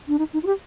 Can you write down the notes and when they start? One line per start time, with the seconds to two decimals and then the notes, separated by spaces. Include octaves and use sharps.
0.08 D4
0.19 D#4
0.33 D#4
0.43 F4
0.46 G4